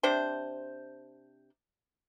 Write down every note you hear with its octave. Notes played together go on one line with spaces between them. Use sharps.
C3 D4 C5